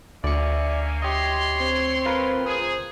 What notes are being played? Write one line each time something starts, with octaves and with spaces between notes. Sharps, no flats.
D2 A#3 C#4 D5 E5 G#5 C#7
G4 C#5 D#5 C6
C4
F4 A#4 B4
G#4 C5